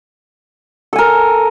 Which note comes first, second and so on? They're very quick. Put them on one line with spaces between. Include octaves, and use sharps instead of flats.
A4 G#5 A#4